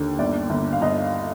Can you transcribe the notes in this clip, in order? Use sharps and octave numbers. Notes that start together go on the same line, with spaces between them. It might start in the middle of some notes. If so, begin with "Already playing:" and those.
Already playing: D#2 D3
G1 D5
G1
F5
G1 D#5